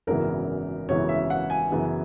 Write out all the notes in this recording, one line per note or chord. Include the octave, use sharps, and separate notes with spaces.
G#1 F#2 C#3 E3 B3 A#4
G#1 F#2 C#3 E3 B3 C#5
E5
F#5
G#5
F#2 C#3 E3 B3